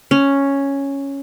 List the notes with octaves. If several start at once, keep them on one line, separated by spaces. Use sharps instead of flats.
C#4